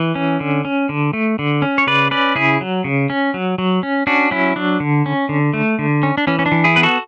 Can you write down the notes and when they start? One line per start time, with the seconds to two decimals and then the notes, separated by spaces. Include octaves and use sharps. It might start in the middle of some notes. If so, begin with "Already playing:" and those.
Already playing: E3
0.15 C#4
0.40 D3
0.65 C#4
0.89 D3
1.13 A3
1.39 D3
1.62 C#4
1.78 C#5
1.87 C#3 B4 D5
2.11 C#4 B4 D5
2.36 C#3 E4 G#4
2.61 F#3
2.84 C#3
3.10 C#4
3.34 F#3
3.58 F#3
3.83 C#4
4.07 C#4 D4 F#4
4.31 F#3 C#4 E4
4.56 F#3 D4
4.80 D3
5.06 C#4
5.29 D3
5.54 A3
5.79 D3
6.03 C#4
6.18 D4
6.27 E3 C#4
6.39 C#4
6.46 D4
6.52 E3
6.64 E4 G#4
6.76 B3 B4
6.83 F#4 A4